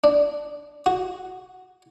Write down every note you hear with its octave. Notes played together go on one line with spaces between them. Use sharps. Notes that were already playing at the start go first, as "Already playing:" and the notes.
D4
F#4